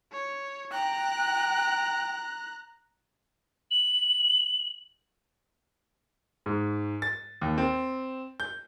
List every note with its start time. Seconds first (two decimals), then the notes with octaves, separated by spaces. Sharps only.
0.12 C#5
0.72 G5 A#5 F#6
3.70 F#7
6.46 G#2
7.02 A6
7.41 D#2
7.58 C4
8.40 G6